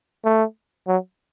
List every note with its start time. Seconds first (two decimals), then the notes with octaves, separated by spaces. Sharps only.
0.25 A3
0.87 F#3